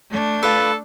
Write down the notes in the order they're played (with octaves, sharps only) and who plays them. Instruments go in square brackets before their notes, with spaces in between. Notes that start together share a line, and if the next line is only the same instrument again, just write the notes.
[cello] A3 D4
[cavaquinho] F4 B4 [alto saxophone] A4